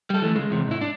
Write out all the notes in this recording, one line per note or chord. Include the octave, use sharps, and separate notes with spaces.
G3 A4
E3 A3
C#2 G#3
E2 C3
G#2 E4
D4